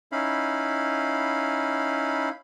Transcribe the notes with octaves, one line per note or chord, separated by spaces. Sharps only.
C#4 D#4 E4 F5 B5